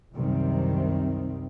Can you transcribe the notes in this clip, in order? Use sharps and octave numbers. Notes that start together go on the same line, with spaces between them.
C2 F#2 C3 D#3 G3 C4